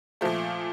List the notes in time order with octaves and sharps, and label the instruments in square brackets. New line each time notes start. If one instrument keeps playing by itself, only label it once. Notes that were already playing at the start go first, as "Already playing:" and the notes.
[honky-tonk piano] A#2 F3 A3